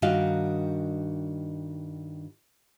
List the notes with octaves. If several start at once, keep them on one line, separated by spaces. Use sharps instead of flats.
G2 D#3 F#4 D#5 F5